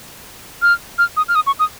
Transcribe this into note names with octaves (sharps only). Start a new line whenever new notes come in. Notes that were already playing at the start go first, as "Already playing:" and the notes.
F6
F6
D#6
F6
D#6
C#6
D#6